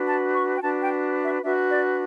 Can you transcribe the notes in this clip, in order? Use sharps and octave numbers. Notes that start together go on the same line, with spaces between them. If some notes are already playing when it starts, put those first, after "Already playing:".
Already playing: D4 F#4 B4
A5
C#6
G5
D4 F#4 B4 A5
G5
E5
D4 F#4 B4 E5
D5